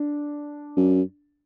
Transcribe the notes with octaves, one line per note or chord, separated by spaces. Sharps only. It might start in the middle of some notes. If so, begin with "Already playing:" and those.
Already playing: D4
F#2